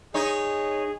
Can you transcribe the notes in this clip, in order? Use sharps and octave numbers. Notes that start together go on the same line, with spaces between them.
D#4 G#4 C#5